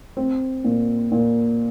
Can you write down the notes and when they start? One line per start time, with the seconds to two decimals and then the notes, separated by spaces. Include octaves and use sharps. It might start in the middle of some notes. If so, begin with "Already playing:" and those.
0.17 C4
0.64 A#2
1.12 A#2